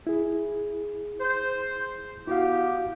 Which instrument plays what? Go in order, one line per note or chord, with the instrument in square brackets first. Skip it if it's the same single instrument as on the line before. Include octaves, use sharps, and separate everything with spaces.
[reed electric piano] E4 G#4
[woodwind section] C5
[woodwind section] B3 G4 [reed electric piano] E4 F#4 F5